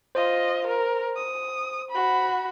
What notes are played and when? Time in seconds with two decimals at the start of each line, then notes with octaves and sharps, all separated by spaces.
0.15 F4 C5 D#5
0.67 A#4
1.16 D#6
1.90 F#4 B5